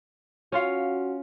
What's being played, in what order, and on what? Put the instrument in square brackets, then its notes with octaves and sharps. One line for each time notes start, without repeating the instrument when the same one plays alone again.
[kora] C#4 F4 F5 [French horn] F#4